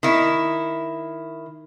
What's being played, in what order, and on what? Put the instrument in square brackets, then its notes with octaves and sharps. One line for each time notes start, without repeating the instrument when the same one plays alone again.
[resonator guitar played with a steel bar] D#3 E4